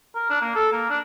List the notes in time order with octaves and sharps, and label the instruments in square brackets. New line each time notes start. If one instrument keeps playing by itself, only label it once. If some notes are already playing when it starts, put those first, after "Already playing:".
[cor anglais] A#4
D4
A#3
A4
A#3
D4